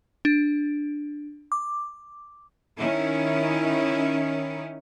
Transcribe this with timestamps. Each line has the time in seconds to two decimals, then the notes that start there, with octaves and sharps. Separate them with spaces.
0.25 D4
1.52 D6
2.77 D#3 C#4 E4